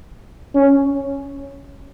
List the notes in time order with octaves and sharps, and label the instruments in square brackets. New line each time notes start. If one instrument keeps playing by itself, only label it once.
[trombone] C#4